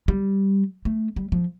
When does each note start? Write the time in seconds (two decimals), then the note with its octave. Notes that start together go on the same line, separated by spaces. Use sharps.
0.08 G3
0.85 A3
1.16 G3
1.32 F3